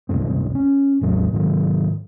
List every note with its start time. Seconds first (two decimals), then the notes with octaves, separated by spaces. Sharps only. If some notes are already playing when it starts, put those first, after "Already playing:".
0.09 D1 C2 G2 C4
0.55 C#4
1.01 A1 E2 F#3
1.33 G#2 D#3 F#3